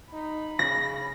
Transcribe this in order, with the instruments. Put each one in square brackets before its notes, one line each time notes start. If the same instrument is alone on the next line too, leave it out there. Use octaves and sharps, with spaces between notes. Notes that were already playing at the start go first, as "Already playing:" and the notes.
[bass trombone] D#4 [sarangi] B5
[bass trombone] C#3 [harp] A#6